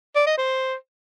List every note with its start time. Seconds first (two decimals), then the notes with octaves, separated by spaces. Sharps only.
0.16 D5
0.27 D#5
0.38 C5